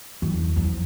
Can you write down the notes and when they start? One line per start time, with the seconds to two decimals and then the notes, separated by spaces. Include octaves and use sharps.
0.22 E2
0.56 F2